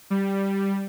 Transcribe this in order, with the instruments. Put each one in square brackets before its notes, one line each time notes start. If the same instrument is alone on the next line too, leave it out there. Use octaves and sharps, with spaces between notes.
[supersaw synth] G3